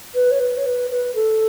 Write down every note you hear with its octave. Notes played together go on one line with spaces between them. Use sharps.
B4
C#5
B4
C#5
B4
B4
A4